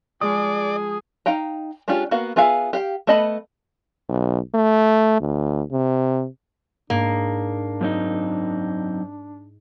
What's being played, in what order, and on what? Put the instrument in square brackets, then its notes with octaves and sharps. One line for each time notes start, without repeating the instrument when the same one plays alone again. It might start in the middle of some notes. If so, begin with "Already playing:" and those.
[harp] F3 G#3 [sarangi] G#4 [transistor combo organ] D5 [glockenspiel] D#6
[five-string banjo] D#4 F5 G5 A#5
G#3 C#4 D4 F4 G4
A#3 B3 F#4 F5
B3 F4 G#4 E5 F5
G4 F5 G5
A3 B3 D#5 A5 B5
[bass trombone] B1
A3
D2
C3
[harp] G#2 D#6 [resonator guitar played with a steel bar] A#3 [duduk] D4
[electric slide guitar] F#2 C4 D#4